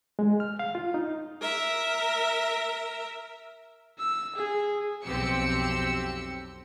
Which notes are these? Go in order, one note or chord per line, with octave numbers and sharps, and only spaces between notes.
G#3
F6
F5
F4
D#4
A#4 E5
E6
G#4
B1 F2 C4 G4 E6 C#7